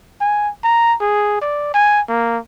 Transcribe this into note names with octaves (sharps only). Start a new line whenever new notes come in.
G#5
A#5
G#4
D5
G#5
A#3